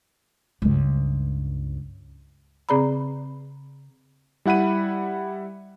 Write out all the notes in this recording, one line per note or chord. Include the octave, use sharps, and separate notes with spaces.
C#2 G2
C#3 C4 G#4 D5 A#5 B5
G3 E4 F#5 B5 D#7